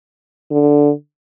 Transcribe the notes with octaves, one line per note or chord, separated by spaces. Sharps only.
D3